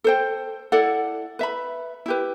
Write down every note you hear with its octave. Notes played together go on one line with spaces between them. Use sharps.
A4 C5 G5
E4 A4 D5 F#5
B4 E5 B5
E4 G4 B4